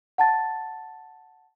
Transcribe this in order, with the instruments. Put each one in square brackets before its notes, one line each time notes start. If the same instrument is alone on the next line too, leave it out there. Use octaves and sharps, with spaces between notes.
[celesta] F#5 A5 A6